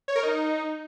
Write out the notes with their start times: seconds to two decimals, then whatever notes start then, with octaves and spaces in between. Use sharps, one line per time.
0.08 C#5
0.15 A#4
0.23 D#4